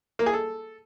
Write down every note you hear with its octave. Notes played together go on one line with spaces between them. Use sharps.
A#3
G#4
A4